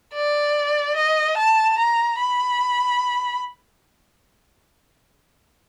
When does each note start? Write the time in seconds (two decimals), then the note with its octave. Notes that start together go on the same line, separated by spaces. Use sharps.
0.14 D5
0.96 D#5
1.37 A5
1.78 A#5
2.19 B5